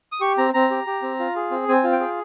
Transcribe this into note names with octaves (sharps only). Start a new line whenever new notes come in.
D#6
G4 C#6
C4 A#5
C4 A#5
G4
G4
C4
F4
G#4
C4
C4 G#5
F4
G5
G#4